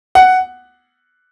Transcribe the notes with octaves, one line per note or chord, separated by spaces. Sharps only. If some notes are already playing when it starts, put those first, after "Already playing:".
F#5